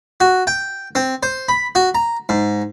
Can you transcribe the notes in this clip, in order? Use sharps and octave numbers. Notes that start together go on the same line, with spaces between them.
F#4
G5
C4
C5
B5
F#4
A#5
G#2